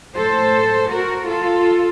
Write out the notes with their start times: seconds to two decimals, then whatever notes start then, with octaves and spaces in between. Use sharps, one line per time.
0.16 A2 A4 C5
0.92 F#4 A#4
1.29 F4 A4